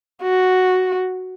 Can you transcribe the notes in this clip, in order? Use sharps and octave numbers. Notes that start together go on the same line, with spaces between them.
F#4